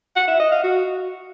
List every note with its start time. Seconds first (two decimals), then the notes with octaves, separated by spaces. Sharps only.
0.16 F#5
0.28 E5
0.40 D#5
0.52 F5
0.63 F#4